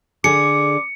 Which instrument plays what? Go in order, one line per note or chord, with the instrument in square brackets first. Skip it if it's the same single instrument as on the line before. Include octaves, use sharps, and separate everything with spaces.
[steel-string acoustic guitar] D3 D4 G#4 [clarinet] D6 [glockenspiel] C#7